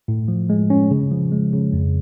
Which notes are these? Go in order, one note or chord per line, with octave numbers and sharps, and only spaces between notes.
A2
F3
G#3
C#4
C#3
F3
G#3
C#3
F2